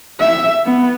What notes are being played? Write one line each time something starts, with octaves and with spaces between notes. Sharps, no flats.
E5
B3